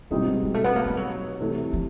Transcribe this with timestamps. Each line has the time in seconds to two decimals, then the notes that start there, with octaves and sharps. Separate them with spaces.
0.11 B2 G3 G#3 C4 D#4 G#4
0.26 G#3
0.43 G#3
0.54 A3
0.64 B3
0.76 A#3
0.86 A3
0.97 F#3
1.40 C3 E3 A3
1.73 F3